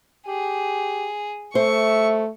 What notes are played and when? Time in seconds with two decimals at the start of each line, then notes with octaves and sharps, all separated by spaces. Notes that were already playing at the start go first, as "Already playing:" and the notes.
0.27 G4 G#4
1.55 A3 C5 E5 C#6